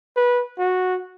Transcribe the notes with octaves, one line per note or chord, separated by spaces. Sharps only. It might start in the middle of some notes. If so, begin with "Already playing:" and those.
B4
F#4